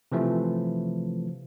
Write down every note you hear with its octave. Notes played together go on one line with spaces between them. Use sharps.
C3 E3 F3 A3